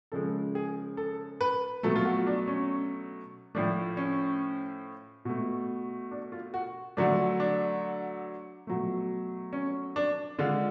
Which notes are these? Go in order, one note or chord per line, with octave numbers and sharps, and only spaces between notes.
C#3 F3 G#3 A4
G#4
A4
B4
B2 F#3 A3 A4
F4
F#4
D4
C#4
A2 F3 A3 D4
C#4
B2 A3
D4
F4
F#4
D3 F#3 A3 D4
D4
B2 F#3 A3
C#4
D4
D3 G#3 F4